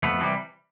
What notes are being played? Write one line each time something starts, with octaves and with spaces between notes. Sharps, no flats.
F2 A3 B3
C3 E3 G3